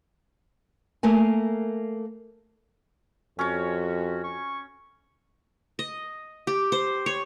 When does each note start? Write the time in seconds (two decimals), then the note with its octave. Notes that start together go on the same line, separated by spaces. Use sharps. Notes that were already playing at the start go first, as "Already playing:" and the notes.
1.03 A3 A#3 A#4 G#5
3.39 F2 C#4 F#4 C#5
4.24 C#6
5.79 D#5
6.47 G4
6.72 C5
7.06 C#5